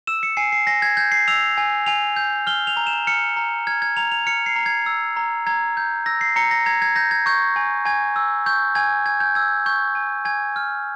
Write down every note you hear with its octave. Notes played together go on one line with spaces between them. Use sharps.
E6 E7
C#7
G#5 C7
C7
G#5 A#6
G#6
G6 G#6
C7
E6 F7
G#5
G#5 F7
G6
F6 G7
F7
A#5
E7
F6 C#7
A#5
F6 G#6
G#6
A#5 F7
F7
F6 C#7
C7
A#5
G#6
E6
A#5
A#5 G#6
G6
E6 A#6
C7
A#5 C#7
A#6
A#5 G#6
G#6
G6 A#6
G#6
C#6 G6
G#5
G#5 G#6
E6
C#6 G6
G#5 G#6
G#5 G#6
G6
E6 G#6
C#6 G6
G#5
G#5 G#6
F6